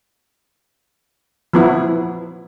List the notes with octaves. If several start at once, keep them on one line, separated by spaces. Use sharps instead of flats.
F3 B3 E4